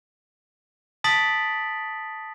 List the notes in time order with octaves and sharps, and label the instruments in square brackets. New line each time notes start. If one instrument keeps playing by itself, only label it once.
[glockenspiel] A5 D#6 A6 B6 D7 F#7